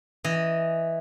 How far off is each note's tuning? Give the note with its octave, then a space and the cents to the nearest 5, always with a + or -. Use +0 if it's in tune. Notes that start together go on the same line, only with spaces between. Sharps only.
E3 +0 D#5 +0